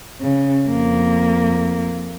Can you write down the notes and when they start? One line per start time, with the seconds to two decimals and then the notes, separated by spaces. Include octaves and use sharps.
0.21 C#3
0.68 F2 A#3